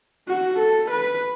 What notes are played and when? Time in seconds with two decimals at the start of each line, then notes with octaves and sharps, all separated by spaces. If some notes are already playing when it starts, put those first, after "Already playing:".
0.28 F#4
0.59 A4
0.91 B4